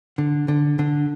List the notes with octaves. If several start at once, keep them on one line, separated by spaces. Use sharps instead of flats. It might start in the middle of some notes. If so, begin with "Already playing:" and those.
D3
D3
D3